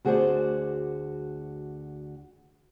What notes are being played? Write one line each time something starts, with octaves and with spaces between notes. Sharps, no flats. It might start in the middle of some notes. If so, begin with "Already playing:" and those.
D2 F#4 G#4 B4 C5 D5